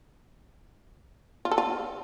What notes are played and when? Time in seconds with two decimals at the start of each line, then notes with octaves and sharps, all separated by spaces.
1.45 F4
1.51 A4
1.58 F4